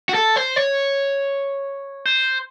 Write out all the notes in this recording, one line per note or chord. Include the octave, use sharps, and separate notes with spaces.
F#4
A4
C5
C#5
C5